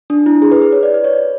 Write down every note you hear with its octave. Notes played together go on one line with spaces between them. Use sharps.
D4
E4
G#4
B4
B4
C#5
D5
B4
C#5